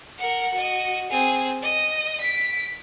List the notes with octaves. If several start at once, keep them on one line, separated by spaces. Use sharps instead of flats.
A#4 F#5
F#4 D#5
C4 G#4
D#5
B6 D7